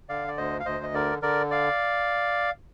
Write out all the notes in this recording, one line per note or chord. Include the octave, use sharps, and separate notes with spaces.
D3 D5 F5
D5
D2 C5 D#5
F5
D2 C5 D#5
D#5
D3 A#4 D5
D3 A#4 D5
D5 F5